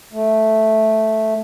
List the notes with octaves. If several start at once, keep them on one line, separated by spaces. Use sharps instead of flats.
A3